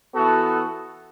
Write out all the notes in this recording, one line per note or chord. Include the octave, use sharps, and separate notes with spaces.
E3 B3 F#4 A4